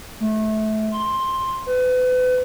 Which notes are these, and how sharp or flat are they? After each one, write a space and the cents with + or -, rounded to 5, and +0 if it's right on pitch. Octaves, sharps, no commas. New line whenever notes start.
A3 -25
C6 +10
B4 +35